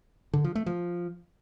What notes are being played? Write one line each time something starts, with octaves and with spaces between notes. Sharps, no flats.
D3
F3
A3
F3